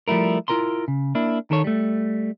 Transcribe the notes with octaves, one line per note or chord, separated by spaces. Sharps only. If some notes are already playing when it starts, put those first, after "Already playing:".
F3 G3 A3 E4 A#4
E4 F4 A#4 A#5 C6
C#3
A#3 D4 E4
D#3 A4 C#5
G3 A3